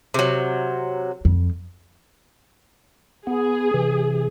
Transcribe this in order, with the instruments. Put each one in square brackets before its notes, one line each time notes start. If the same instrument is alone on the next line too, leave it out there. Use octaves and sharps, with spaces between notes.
[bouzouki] C3 F#3
[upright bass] F2
[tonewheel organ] B3 [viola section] G#4
[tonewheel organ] C3 E3